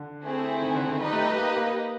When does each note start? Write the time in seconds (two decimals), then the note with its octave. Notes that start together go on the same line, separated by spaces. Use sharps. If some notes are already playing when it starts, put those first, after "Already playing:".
Already playing: D3
0.24 A3 C4 E4 G#4
0.61 D#3
0.75 D3
0.87 D#3
1.00 G3 D#4 G4 B4 D#5
1.13 A3
1.26 A3
1.38 A#3
1.56 A#3